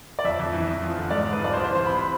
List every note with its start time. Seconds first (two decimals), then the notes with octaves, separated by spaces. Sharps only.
0.19 D5
0.24 F2 E5
0.39 F2
0.53 E3
0.67 E2
0.82 F3
0.96 D3
1.10 G#2 D5
1.25 G#2
1.33 B4
1.39 F3
1.44 D5
1.53 C2 C5
1.64 C5
1.68 E3
1.75 C5
1.82 C3 B5
1.97 B5